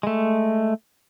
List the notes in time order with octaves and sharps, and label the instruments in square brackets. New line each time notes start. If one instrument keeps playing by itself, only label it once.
[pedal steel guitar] G#3 A3